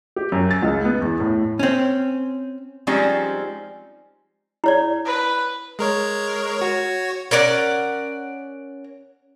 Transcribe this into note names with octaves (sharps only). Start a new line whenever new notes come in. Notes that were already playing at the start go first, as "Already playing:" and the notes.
G4
F#2
A6
C#2
B3
E2
A2
C4 C#4
F3 G3 G#3 C4 C#4 D#4
E4 C#5 D5
B4
G#3 A#4 C#5
F#4 C#5
C#4 A#4 D5 F#5